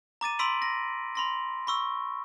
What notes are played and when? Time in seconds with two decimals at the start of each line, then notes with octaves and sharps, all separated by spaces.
0.21 A#5 D6 A6 D#7
0.39 B5 C6 E6 B6 D7 F#7
0.62 A#6
1.15 B5 C6 A#6
1.67 B5 C#6 E6